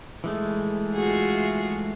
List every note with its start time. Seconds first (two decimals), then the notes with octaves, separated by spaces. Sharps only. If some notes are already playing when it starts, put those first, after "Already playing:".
0.24 E3 G#3 A3
0.94 F4 F#4 G#4